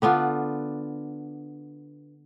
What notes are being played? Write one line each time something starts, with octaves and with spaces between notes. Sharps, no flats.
D3 B3 D4 F4